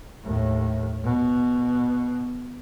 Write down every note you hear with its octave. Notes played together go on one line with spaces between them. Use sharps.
D#2 A2
B2